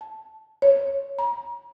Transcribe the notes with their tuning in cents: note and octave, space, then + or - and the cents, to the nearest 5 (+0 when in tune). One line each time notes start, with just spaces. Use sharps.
A5 -5
C#5 -5
A#5 +35